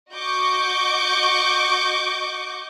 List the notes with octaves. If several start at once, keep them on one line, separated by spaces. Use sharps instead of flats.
F#4 D#5 C#6 D6 G6